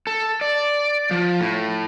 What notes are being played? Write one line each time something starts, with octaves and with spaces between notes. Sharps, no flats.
A4
D5
F3
A2